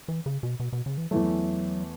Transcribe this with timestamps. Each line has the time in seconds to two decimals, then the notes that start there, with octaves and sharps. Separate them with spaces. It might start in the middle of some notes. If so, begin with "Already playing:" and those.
0.08 E3
0.26 C#3
0.43 B2
0.60 B2
0.73 B2
0.86 C#3
0.98 E3
1.11 E2 E3 F#3 A3